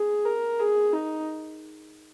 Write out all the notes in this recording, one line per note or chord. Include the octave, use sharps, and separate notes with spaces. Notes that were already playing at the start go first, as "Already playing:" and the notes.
Already playing: G#4
A#4
G#4
D#4